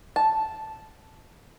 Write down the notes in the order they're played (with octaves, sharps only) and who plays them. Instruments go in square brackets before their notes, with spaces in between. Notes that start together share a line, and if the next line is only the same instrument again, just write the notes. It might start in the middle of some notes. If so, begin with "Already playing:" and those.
[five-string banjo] A5